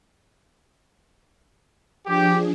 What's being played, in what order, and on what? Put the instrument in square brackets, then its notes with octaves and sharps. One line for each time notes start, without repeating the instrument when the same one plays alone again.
[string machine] F3 D4 G#4 [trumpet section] G4